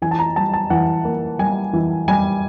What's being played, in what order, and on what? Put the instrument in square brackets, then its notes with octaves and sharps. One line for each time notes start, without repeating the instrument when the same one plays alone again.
[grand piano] E3 G#5
A5
A#5
G3 A5
A5
E3 F#5
A#3
G3 G#5
E3
G3 G#5